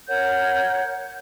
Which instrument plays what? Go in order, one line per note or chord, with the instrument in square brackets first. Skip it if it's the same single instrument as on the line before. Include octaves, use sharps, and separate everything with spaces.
[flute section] A#4 C#5 F#5 G6